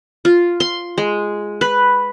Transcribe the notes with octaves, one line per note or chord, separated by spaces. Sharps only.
F4
C6
G#3
B4